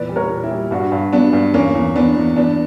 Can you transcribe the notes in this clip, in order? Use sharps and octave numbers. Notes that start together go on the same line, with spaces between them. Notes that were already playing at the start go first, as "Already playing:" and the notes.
Already playing: E2 A#2 B4 D5
G3
A#4 C#5
A#2
E4 G4
G3
G2 D4 F#4
G2
F#3 B3 D4
G2
E2 A#3 C#4
E2
E2 B3 D4
E2
E2 B3 D4